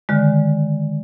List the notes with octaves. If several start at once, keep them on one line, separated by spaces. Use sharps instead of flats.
D3 D#3 G#3